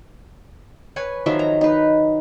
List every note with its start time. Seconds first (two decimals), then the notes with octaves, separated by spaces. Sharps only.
0.96 B4 C#5 G#5
1.26 D#3 F3 F#3 E5
1.39 A#5
1.61 D#4 B4